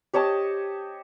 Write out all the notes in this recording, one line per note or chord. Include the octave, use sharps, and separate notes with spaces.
G4 C#5 D#5 A5